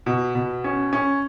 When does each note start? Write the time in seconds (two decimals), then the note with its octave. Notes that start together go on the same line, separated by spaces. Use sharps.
0.06 B2
0.35 B2
0.64 C#4
0.93 C#4